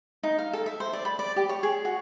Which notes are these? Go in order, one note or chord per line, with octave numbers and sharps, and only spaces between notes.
D#4
F5
A4
E5
C5
D5
B5
D5
G4
C#5
G#4
F#4